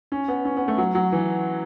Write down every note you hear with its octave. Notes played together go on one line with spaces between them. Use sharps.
C#4
B3
C#4
B3
A3
F#3
F#3
E3